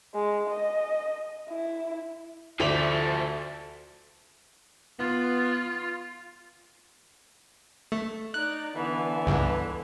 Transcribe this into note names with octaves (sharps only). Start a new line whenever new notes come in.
G#3
D#5
E4
D2 F3 A3 A4 D5 B5 F7
B3 F4
A3
D#4 D5 F#6
D3 E3 B3
C#2 G2